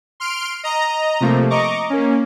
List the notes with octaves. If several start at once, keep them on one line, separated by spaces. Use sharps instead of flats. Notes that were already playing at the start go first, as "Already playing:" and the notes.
C6 F6 D7
D#5 A#5
C3 F3 A3 A#3
D#5 A#5 C#6 D6
A#3 C#4